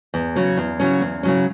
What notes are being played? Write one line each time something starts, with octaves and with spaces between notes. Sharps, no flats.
E2
C#3 F#3 C#4
E2
C#3 F#3 C#4
E2
C#3 F#3 C#4